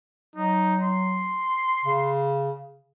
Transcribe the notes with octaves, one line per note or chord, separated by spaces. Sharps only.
F#3 D#4
C6
C#3